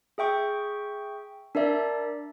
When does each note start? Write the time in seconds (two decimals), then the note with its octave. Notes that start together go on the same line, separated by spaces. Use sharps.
0.18 G#4 E5 G5 C#6
1.55 D4 A#4 D5 E5